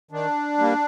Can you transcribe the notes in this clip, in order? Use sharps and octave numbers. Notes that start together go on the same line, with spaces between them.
D#3 D4
G3 A#3